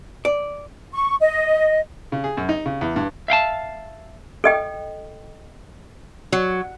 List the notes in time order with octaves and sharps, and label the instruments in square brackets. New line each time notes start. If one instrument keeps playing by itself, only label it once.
[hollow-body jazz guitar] D5
[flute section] C#6
D#5
[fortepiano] C#3
G#4
F#2
D#4
C#3
E2
G2
[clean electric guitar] E5 F5 G5 A5
[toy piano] A4 D#5 G5
[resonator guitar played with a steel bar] F#3